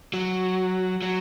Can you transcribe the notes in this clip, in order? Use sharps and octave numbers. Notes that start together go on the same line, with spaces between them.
F#3
F#3